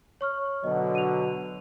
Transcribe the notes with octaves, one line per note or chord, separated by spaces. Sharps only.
C#5 C#6 F6
B2 D3 F#3 D#5
D#7 F7